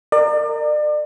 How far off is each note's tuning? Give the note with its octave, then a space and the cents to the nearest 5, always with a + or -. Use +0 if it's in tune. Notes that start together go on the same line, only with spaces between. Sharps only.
A#4 -25 D5 +35